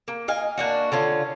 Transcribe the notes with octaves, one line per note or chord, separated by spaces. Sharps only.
A#3
D#5 F5 G#5
A#3 D4 F#4
D3 C#4 F4